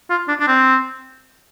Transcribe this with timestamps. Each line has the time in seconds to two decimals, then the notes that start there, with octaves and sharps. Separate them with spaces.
0.10 F4
0.28 D4
0.40 D4
0.47 C4